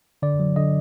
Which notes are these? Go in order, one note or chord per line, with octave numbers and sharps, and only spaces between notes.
D3 D5
F#3
D3 D#5